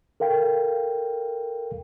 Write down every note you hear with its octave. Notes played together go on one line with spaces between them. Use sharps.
A4 A#4 F5 G5